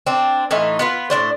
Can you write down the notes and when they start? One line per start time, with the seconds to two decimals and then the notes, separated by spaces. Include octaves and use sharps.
0.07 C4 D4
0.51 A2 E3 D#4 F4
0.79 B3 F4 B4
1.10 A2 D#3 D4 C5